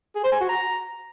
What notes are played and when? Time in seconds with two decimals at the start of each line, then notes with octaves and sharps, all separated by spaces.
0.16 G#4
0.24 C5
0.32 G#5
0.41 F#4
0.49 A#5